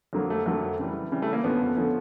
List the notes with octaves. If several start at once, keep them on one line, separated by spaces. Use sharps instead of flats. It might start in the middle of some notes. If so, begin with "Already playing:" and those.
F2 D3 F#3 A#3
A3
F2 D3 F#3 A3 A#3
C#3 E3 G3
C#3 E3 G3
A3
A#3
F2 D3 F3 A3 B3 C#4
D3 F3 A3 C#4